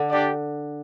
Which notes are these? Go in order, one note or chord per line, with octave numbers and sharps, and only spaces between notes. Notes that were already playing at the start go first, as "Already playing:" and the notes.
Already playing: D3
D4 G4 D5